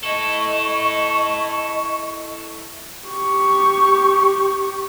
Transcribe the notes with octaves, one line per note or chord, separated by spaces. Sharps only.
E4 A4 D#5 C#6
G4 C#6